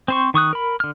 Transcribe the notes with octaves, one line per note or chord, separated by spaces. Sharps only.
C4 C5 C#6
D#3 C#6 D#6 F#6
A#4 B5
D3 F6